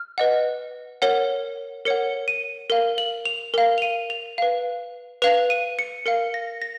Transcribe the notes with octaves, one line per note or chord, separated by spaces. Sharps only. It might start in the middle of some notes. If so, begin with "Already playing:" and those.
Already playing: F6
B4 D#5 F#5
A#4 C#5 F#5
A#4 C#5 F#5 C#7
D#7
A#4 F5
F#7
F7
A#4 F5
F7
D#7
F7
B4 F5
B4 F5 F7
D#7
C#7
A#4 F5 C#7
A#6
A#6